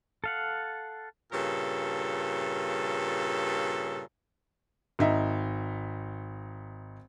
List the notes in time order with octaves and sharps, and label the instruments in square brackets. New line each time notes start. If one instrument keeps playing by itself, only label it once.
[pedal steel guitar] A4 F5 F#5
[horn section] G2 A#2 C#3 A4
[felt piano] G#1 D#4 E5